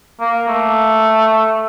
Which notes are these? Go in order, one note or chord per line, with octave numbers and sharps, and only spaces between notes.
A#3
A3